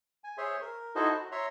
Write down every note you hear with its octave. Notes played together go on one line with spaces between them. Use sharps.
G#5
G#4 C5 C#5 E5 C6
A#4
D#4 E4 F#4 A4 C5 D#5
F#4
C#5 E5 A#5 C6